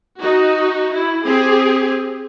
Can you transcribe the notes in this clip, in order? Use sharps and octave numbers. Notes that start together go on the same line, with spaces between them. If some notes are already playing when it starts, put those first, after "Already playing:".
D#4 F#4
E4
C4 G4 G#4